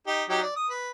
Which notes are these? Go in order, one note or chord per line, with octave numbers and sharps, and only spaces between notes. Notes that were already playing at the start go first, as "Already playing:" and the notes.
D#4 G4
F#3 D#4 G4
D5
D#6
B4